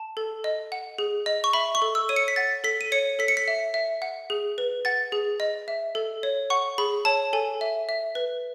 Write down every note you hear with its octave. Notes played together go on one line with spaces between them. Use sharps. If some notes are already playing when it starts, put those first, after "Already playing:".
Already playing: A5
A4
D#5
F#5
G#4
D#5
C#6
E5 B5
C#6
A4
E6
C#5 D#7
C#7
B6
F#5 A6
A4 B6
D#7
C#5 C#7
A4 B6
C#7
B6
E5
E5
F#5
G#4
B4
F#5 A6
G#4
D#5
E5
A4
C#5
F#5 C#6
G#4 B5
C#5 A5
A4 G#5
E5
E5
B4